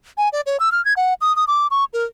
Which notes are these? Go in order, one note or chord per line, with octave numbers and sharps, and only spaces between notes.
G#5
D5
C#5
E6
F6
G#6
F#5
D#6
D#6
D6
C#6
A#4